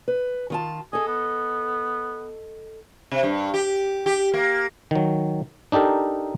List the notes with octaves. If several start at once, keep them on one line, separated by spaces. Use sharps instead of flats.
B4
D#3 F4 A5
G#4 A4 D#5
B3
C3
G2
G4
G4
A#3
D#3 F#3
D4 D#4 G4 A4 A#4